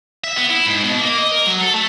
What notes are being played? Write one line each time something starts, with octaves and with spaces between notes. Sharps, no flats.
E5
B3
E4
G#2
B2
A#3
D#5
A#4
F#3
A4
A3